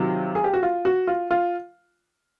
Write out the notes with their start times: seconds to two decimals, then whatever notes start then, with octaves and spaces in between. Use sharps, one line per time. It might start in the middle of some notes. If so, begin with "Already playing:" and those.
Already playing: C3 D#3 F#3 F4
0.35 G#4
0.44 G4
0.54 F#4
0.63 F4
0.85 F#4
1.07 F4
1.31 F4